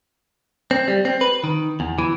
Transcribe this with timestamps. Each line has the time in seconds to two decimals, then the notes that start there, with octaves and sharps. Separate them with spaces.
0.71 C4
0.88 G3
1.05 C4
1.21 B4
1.44 D#3
1.80 E2
1.99 E3